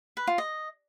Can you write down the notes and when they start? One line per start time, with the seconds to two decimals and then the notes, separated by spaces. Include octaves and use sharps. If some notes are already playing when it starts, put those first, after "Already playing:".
0.17 B4
0.27 F4
0.38 D#5